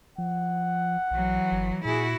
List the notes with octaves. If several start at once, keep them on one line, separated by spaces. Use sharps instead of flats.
F3 F#5
B1 E3 F#3
G1
A#2 E4 F#4 G#4